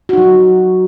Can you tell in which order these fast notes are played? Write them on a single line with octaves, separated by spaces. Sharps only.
F#4 D#4 F#3